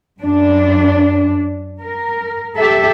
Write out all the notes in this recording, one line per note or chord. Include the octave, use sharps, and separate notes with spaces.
F#2 D4
A#4
G4 A4 E5